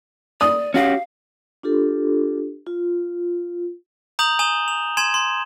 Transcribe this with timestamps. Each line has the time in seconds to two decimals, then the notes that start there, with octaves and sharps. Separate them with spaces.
0.41 D5 D#6
0.74 C#4 F#4 G4 F5
1.63 D4 F4 G4 A4
2.66 F4
4.19 A#5 D#6 G6 F7 F#7
4.39 G#5 D#6 E7 G7
4.68 F7
4.97 G#5 C6 G#6 E7
5.14 C6